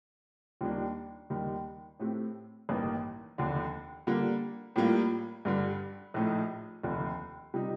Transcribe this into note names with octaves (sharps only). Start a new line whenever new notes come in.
D#2 D#3 G3 A#3 D4
D#2 D#3 G3 A#3
A2 A3 C4 G4
A1 G2 D#3 A#3
F1 D#2 D3
D3 G3 A#3
A2 G3 A#3 F4
G2 D3 G3
A#1 A2 A3 D#4
F1 D#2 D3
C3 G3 C4 D#4